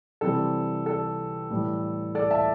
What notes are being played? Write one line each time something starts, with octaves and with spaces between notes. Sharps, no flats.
C3 E3 G3 C4 A4
A4
A2 E3 G3
A4 D5
E5 A5